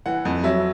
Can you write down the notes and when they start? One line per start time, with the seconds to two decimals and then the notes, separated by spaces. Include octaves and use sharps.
0.06 E3 F#5
0.25 F2
0.44 F#3 E5